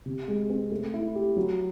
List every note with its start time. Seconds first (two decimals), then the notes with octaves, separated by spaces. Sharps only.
0.06 C3
0.28 G#3
0.50 C4
0.72 A3
0.94 E4
1.15 G4
1.37 F#3